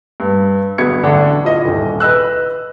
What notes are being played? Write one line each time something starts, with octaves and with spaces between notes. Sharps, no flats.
G2
G1 F#3 B3 G#6 C#7
A1 D3 D4 F#5
E4 F4 D#5
D#1 C2
B4 D#5 E6 F#6